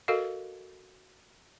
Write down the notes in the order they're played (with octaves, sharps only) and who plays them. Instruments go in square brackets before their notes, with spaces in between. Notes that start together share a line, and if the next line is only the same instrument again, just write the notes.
[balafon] F#4 A4 A#4 D#5 F5